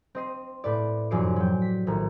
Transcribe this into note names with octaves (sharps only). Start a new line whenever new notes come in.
C4 D#5 C7
A2 B4 D5
F1 F#2 F3 D5 C7 D7
F#3 G5
B6
A#1 A2 D#3